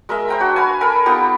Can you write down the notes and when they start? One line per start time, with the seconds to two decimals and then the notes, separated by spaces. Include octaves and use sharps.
0.09 G#3 A#4 D#5 E5
0.28 C5 G5 A#5
0.40 D4 F#4
0.56 B4 F5 G#5
0.81 A4 A#4 G#5 B5
1.06 B3 D#4 F4 G4